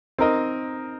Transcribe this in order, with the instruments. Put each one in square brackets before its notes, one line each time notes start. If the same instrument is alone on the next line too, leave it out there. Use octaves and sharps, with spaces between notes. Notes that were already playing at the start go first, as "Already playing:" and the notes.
[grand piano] C4 D#4 A#4 D#5